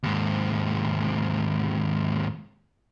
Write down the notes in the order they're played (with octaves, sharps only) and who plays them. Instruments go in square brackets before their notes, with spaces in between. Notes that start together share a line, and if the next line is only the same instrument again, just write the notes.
[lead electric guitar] D#2 G#2